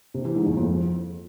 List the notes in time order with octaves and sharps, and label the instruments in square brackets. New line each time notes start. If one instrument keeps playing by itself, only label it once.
[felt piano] C3
E3
G#2
E2
F2